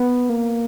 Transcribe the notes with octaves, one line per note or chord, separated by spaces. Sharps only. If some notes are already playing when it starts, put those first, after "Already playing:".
Already playing: B3
A#3